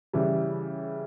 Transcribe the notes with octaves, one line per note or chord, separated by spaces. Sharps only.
C#3 E3 G3